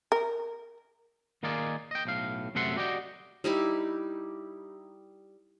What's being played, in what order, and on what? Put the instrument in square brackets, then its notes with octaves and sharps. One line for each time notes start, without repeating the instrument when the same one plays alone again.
[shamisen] A#4
[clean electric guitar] D#3 A#3 D#4 F4 G#4 D5
D#5 G5
B1 A2 F5
F#2 C3 A3 E5 F#5 C6
F#4 G4 D5 D#5 G5
[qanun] G3 D#4 E4 G4